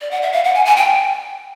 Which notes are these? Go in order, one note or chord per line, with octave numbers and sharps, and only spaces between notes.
D5
F#5
E5
F5
F#5
G#5
G#5
G5